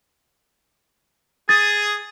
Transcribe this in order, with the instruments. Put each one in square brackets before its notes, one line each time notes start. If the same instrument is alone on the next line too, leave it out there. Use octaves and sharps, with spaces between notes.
[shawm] G#4 [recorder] D#6 [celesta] A6